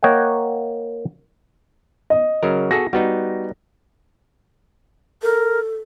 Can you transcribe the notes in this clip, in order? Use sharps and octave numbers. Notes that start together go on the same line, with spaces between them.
A#3 C#5 D#5 F#5 G5
D#5
C#3 F#3 A#4
F#4 G#4 A4 A#6
G3 B3 D#4 F#4
A4 A#4